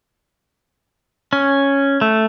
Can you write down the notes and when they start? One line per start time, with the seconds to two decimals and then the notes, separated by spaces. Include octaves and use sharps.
1.33 C#4
2.01 A3